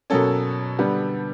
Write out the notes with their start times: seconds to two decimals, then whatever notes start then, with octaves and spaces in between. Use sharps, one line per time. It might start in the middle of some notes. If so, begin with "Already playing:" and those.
0.10 B2 F#3 A#3 C#4 A4
0.79 D3 G3 B3